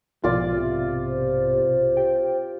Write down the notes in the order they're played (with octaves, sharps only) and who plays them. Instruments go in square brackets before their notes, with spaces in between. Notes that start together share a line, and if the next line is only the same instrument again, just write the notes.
[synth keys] B1 G#2 B2 [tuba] F3 [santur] F4 D5
[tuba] C3 [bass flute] E5
[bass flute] C5
[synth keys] G4 G5